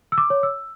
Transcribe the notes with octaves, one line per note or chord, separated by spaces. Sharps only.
E6
D6
C#5
E6